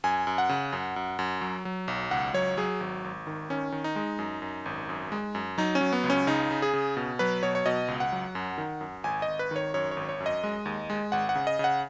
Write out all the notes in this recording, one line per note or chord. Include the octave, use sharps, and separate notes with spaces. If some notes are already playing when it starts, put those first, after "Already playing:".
F#2 G#5
F#2
F#5
C#3
F#2
F#2
F#2
F#3
F#3
B1
C#2 F#5
F#3 C#5
F#3 G#4
G#1
G#1
D#3
D#3 C#4
D#3
D#4
G#3
F#2
F#2
G#1
F#2
G#3
F#2
F#3 D#4
C#4
F#3
B3
C#2
C#4
C#3 D#4
C#3
G#4
C#3
B2
F#3 B4
B2 C#5
C#5
B2 D#5
C#2
F#5
F#3
F#2
D#3
F#2
G#1 G#5
D#5
G#1
B4
D#3 C#5
F#2 C#5
C#5
G#1
C#5
F#2
D#5
G#3
D#2
G#3
G#1 F#5
F#5
C#3
D#5
C#3 F#5